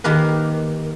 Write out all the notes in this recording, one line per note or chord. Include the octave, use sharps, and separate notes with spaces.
D#3 A#3 G4 A#4 B4